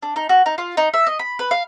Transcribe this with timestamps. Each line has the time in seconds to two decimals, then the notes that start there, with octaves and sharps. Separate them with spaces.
0.03 D4
0.16 D#4
0.29 F#4
0.46 D#4
0.58 F4
0.77 D#4
0.94 E5
1.07 D#5
1.19 B5
1.39 B4
1.51 F5